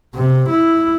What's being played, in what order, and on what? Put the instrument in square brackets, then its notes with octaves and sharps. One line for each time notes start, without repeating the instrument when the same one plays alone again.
[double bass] C3
E4